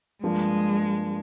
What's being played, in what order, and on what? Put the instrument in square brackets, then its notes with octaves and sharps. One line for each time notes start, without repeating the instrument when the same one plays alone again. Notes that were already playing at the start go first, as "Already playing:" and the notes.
[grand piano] G2 F3 A#3 [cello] G#3